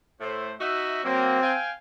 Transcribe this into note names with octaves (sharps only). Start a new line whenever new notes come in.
A2 A3 C5
D#4 F#4 E5
F#3 A#3 C4
F5 G5 G#5